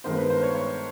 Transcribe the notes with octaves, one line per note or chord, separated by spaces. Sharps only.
G2 D#3 G#3 B3 C5
B4
C5
C#5
C#5